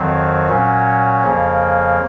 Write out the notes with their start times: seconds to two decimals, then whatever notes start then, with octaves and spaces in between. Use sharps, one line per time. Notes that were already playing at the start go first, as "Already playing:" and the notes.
Already playing: F2 D#3 F#3 C4
0.49 A#2 F#3 C#4
1.23 F2 C#3 F3 A#3